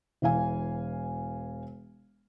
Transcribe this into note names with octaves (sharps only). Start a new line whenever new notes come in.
E1 E3 F5 G#5